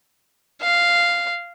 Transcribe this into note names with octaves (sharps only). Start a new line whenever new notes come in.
F5